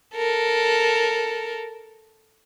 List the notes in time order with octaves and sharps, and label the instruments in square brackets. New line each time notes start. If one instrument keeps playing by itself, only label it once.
[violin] A4 A#4